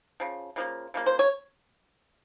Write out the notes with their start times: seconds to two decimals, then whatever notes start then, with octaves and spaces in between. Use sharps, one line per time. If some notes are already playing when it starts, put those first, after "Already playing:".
0.20 C#3 F3
0.56 C#3 F3 A#3
0.94 C#3 F3 A#3
1.06 C5
1.19 C#5